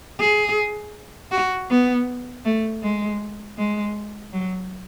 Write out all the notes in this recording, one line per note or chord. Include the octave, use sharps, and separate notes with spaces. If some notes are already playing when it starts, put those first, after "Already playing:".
G#4
F#4
B3
A3
G#3
G#3
F#3